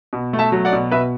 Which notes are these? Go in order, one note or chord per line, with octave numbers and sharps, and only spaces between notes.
B2
A3
E5 A5
F#3
D5 F#5
B2
B2 B4 E5